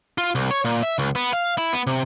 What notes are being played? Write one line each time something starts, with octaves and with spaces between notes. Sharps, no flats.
F4
C2
C#5
A#2
E5
C#2
B3
F5
E4
B3
C3